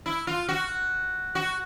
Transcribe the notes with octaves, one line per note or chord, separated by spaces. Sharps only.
E4
F4
F#4
F#4